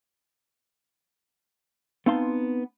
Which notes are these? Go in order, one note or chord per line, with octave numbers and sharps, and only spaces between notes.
B3 C4 D#4 F5 A5 C6